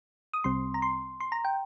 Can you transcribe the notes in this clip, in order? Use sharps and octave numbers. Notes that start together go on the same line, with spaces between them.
D#6
C2 C3 G3 C4 C6
A#5
C6
C6
A#5
G5